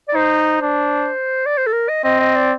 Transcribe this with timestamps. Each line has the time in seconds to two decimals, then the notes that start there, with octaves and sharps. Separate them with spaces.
0.08 D5
0.15 D#4 C5
0.62 D4
1.46 D5
1.57 C5
1.67 A4
1.73 A#4
1.89 D#5
2.04 C4 D#5
2.20 D#5
2.36 D5